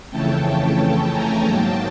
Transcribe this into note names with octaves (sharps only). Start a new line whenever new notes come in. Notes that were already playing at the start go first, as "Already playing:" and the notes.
F2 C#3 E3 A3 C#4 G5 A5
G5 A5
G#5 A#5
G#2 D#3 F#3 A#3 G5 A5